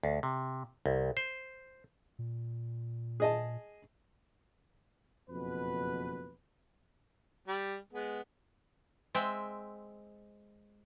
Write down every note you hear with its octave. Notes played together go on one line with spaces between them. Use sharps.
D2
C3
C2
C5
A#2
G#4 D#5 A5
F#1 F2 B2 B4
G3
G#3 B3
G#3 C4 E5 G5